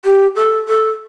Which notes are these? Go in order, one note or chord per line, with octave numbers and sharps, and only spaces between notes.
G4
A4
A4